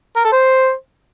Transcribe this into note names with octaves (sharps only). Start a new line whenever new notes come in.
A#4
A4
C5